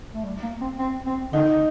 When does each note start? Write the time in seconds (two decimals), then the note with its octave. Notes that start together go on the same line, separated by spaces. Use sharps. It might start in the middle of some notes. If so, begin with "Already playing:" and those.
0.14 A3
0.24 G3
0.43 A#3
0.61 C4
0.79 C4
1.06 C4
1.33 D3 D#4